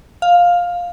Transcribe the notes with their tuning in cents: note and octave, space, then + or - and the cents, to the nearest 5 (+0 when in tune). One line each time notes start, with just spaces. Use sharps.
F5 +10